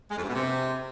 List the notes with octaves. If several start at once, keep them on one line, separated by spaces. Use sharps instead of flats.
G#3
F2
G2
B2
C3